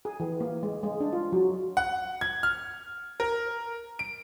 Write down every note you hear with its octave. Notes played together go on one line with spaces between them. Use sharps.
G#4
E3
A#3
G#3
G#3
D4
F4
F#3
F#5
G#6
F6
A#4
D7